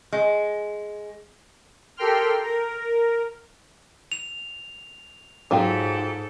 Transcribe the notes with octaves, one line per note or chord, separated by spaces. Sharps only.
G#3
G4 A4 A#4 G5 C6 F6
A#4
F7
G#2 F#3 F4 G4 A4